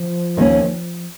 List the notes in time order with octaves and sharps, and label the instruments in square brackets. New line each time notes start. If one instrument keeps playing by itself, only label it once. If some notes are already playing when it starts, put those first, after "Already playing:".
Already playing: [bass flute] F3
[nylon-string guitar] D#2 D#3 A#3 C#4